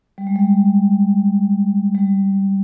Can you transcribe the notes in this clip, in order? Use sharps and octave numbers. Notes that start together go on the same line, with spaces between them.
G3
G#3
G3
G3